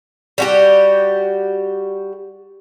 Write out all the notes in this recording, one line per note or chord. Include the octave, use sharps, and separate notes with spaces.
G3 F#4 G4